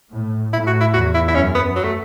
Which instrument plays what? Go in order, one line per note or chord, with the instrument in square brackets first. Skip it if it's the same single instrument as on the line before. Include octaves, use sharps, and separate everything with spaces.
[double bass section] A2
[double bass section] A2 [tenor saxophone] E4
[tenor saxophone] F#4
E4
[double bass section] E2 [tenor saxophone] F#4
[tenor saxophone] E4
E4
[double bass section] F#2 [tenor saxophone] C#4
[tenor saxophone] B3
F#3
A3